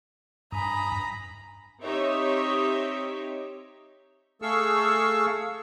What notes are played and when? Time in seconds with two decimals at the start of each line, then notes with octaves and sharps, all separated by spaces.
0.52 G2 G#5 A#5 B5 D#6
1.83 C4 D#4 G4 C#5 E5
4.42 A3 G#4 A4 F5 C#6 E6